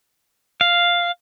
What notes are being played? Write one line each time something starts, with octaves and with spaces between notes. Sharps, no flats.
F5